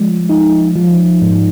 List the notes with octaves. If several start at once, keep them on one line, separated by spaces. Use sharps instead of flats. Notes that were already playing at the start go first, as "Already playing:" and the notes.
Already playing: F3 G#3
D#4
F3
G#2